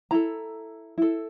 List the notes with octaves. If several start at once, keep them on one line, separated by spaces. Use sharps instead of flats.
E4 A4 A#5
E4 A4